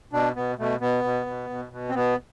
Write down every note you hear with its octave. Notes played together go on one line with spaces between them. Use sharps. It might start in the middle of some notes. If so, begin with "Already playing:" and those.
B2 D4
B2 B3
B2 A3
B2 B3
B2
B2
B2
B2
C4
B2 B3